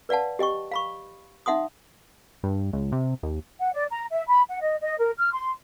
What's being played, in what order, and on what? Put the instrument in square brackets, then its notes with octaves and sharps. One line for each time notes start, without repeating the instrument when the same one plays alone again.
[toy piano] B4 D5 F5 F#5 A5
G4 D#5 G5 C#6
F5 B5 C#6
D#4 E5 F#5 C6 D#6
[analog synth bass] G2
C#2
C3
D#2
[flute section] F#5
D5
A#5
E5
B5
F#5
D#5
D#5
A#4
F6
C6